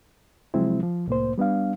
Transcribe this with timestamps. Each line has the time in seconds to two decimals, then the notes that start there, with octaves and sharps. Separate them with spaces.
0.54 C3 F3 F#3 G#3 C4 E4
0.83 F3
1.07 C2 A2 A#3 C5
1.38 G3 B3 D4 F5